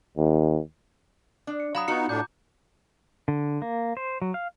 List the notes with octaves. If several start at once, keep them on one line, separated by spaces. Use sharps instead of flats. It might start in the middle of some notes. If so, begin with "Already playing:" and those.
D#2
D4
C#7
F#3 F5 A#5 B5 D#6
B3 D#4 F4 F#4 C#6 C#7
A2 D4 A5 D6 G6
D3
A#3
C5
F#3
F5